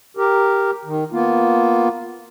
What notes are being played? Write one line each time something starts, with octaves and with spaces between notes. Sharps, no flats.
G4 A#4
D#3
A#3 B3 F4